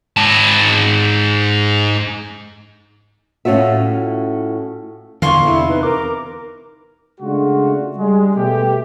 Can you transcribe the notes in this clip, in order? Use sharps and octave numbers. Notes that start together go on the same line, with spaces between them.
G#2 A5
A2 C#4 F4 F#4 E5
E2 A#2 D3 E3 F5 C6 C#6
E2 C3 E4
D#4 B4
A#4 D6
C#3 G#3 A3 D4 F4 F#4
G3 G#3
B2 A3 G4